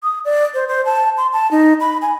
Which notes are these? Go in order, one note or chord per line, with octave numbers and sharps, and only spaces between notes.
D#6
D5
C5
C5
A5
C6
A5
D#4
B5
G#5